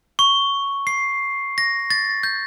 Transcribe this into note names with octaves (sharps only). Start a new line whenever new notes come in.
C#6
C7
A#6
A6
G6